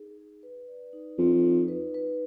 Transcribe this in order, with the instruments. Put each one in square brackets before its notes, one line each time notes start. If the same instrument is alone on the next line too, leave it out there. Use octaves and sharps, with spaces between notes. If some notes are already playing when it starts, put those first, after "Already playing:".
Already playing: [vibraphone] D#4 G#4
G#4
B4
D5
D#4
[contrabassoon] F2 [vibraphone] D#4
[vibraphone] D#4
B4
B4